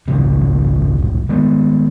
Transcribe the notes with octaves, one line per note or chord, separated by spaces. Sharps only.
G#1 C#2 A#2 C#3
F#1 C2
D#3 G#3 B3